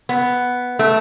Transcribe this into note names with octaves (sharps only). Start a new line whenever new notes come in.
B3
A3